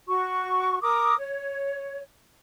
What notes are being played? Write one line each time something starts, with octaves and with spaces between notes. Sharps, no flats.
F#4 C#6
A#4 D6 D#6
C#5